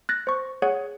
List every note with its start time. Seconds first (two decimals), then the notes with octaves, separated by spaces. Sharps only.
0.09 F#6 A6 A#6
0.27 C5 C#6
0.62 G#4 C#5 F#5